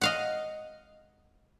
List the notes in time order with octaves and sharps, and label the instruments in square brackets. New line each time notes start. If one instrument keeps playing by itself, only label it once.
[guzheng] D#5 F5 F#5